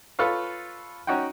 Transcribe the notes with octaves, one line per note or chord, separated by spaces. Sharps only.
F4 A4 B4 C#5 F5
C#4 D#4 F#4 F#5 G5